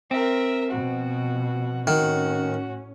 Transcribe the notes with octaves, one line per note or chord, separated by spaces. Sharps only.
C4 A#4 E5
B2 F3 F#4
A2 D#3 C#4 F#4